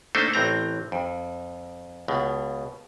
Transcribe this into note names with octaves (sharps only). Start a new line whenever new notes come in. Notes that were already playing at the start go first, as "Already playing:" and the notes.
A3 A#3 D4 D#4 A4 C5
A1 A2 C4 A#5
F2
C#2 B2